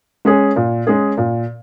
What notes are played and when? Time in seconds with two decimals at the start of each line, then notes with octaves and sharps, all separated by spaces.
0.25 G#3 C#4 G#4
0.56 A#2
0.87 G#3 C#4 G#4
1.17 A#2